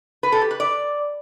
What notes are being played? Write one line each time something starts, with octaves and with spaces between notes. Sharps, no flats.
B4
A4
G4
B4
D5